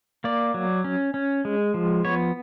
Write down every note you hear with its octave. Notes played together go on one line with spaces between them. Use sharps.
A#3 D5
F#3
C#4
C#4
G#3
F3
B3 C#5